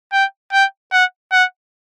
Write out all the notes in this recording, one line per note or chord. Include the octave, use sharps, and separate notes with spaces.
G5
G5
F#5
F#5